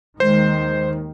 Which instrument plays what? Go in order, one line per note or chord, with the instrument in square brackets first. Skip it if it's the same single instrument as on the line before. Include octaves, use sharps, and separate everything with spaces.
[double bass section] D#2 D#3 [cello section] G#3 [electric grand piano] C5